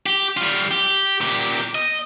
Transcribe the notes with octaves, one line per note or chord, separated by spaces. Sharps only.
G4
G3 F4
G4
A#2 G4
D#5